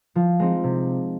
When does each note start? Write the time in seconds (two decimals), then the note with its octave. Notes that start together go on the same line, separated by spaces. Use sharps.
0.15 F3
0.39 G#3 C4 D#4
0.64 C3